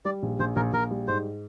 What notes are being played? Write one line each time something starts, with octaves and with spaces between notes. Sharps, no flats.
G3 D5
A#1
A#1 C5
A#1 A#4
A#1 A#4
G3
G#2 C5